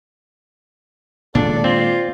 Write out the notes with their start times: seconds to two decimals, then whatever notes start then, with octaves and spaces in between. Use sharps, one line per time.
1.35 A#2 D#3 G#3 D4 A4 D5
1.64 C4 F4